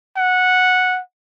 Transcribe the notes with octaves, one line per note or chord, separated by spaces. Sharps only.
F#5